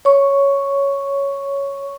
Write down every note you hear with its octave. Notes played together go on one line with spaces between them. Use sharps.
C#5 C#6